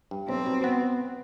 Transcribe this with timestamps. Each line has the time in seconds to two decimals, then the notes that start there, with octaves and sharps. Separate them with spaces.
0.11 G2
0.28 B1 C4
0.46 B2
0.64 B3